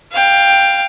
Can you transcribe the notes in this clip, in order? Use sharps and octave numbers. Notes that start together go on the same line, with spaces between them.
F5 G5